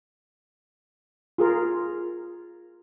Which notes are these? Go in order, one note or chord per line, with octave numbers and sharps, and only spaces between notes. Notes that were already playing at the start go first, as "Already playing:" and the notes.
F4 G#4 A#4